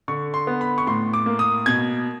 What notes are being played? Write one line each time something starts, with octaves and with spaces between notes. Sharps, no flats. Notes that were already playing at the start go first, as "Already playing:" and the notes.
D3 C#6
C6
B3
B5
C#6
A2 C6
D6
A#3
D#6
B2 G#6